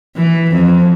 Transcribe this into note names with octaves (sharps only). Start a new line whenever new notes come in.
E3
F2